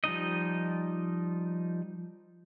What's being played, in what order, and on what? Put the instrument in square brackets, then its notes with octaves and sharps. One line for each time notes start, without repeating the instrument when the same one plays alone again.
[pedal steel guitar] F3 G3 D#4 D#5